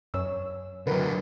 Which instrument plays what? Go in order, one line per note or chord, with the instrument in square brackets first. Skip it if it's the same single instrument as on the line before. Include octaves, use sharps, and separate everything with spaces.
[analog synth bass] F#2 [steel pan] C#5 E6
[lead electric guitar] D3 F#3 [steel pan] A#4 B4